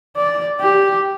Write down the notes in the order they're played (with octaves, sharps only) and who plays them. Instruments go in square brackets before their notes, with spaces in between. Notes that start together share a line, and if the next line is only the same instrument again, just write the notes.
[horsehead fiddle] D5
G4